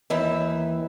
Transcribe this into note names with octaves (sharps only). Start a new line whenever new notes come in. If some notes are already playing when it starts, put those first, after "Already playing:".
D#2 E3 E5